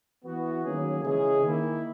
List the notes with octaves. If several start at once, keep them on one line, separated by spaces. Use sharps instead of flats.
E3 B3 F#4
D#3 F#3 A#3 C#4 G#4
C#3 E3 G#3 C#4 G#4
D#3 A#3 E4